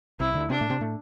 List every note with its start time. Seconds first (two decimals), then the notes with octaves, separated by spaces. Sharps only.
0.20 C2 C3 E4
0.34 D2 D3
0.50 C3 C4 D4
0.61 A2 A3
0.70 C3 C4
0.80 A2 A3